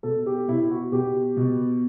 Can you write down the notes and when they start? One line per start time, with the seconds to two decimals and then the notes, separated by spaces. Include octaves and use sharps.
0.03 B2 A4
0.26 G4
0.48 B2 E4
0.71 F#4
0.92 B2 G4
1.37 B2